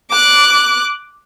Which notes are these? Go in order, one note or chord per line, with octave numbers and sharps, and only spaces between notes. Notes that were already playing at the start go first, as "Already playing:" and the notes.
D6 F#6